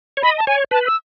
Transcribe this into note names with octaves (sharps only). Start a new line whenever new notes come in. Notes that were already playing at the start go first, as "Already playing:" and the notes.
C#5
D#5 B5
A5
C#5 G#5
B4 A5
E6